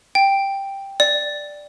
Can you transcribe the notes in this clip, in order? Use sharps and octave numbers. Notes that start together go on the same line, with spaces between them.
G5
D5